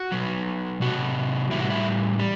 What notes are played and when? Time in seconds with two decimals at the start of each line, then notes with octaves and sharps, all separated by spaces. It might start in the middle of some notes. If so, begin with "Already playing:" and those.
Already playing: F#4
0.12 B2 F#3
0.81 C3 F#3 F#4
1.51 A2 E3 G3 E4
1.60 F#4
1.70 E4
2.19 G3